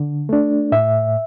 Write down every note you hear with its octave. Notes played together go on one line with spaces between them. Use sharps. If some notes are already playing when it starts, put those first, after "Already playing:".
Already playing: D3
A3 D4
A2 E5